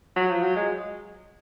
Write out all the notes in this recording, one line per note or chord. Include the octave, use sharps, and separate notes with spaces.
F#3
F3
F#3
G#3